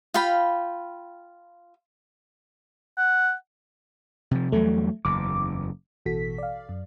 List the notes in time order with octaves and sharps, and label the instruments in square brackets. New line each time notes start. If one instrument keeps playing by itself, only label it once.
[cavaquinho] F4 F5 G5 B5
[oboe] F#5
[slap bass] C3 F3
[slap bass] E2 F#3 G3 [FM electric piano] A3
[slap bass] F#1 E2 [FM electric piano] D6
[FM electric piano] A1 B2 E3 F#4 A4 B6
D5 F5
F#2